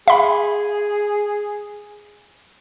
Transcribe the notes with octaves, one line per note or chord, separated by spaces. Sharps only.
G#4 E5 B5